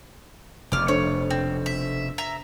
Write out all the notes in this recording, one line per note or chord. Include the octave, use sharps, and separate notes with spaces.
F1 F2 B2 D6 F6
D4 A4 C5 C#5
C4
E5
E5 A#5